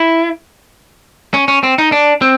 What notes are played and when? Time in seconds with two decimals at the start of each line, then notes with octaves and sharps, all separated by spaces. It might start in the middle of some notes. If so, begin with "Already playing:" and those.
Already playing: E4
1.34 C#4
1.48 C#4
1.63 C4
1.78 D#4
1.92 D4
2.22 C4